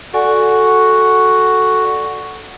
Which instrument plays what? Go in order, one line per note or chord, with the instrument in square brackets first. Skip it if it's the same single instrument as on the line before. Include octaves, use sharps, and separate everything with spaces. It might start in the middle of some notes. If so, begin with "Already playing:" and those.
[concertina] F#4 [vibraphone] A4 D5 G#5